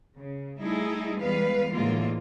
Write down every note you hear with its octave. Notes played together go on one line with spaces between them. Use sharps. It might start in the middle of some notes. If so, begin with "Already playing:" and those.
C#3
G3 A3 D#4 E4 G#4
E2 G3 G#3 B3 B4 F5
A2 D3 E3 G#3 A#3 F4